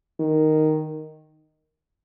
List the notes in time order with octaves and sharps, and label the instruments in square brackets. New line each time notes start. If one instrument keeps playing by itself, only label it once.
[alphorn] D#3